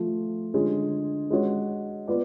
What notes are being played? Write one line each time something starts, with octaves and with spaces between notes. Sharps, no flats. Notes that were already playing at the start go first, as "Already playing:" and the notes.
Already playing: F3 A3 F4
D3 G#3 C#4 F4 G#4
G#3 C#4 F#4 C#5
B3 F4 B4 D5